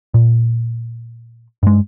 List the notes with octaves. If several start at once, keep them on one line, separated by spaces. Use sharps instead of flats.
A#2
G2 G#3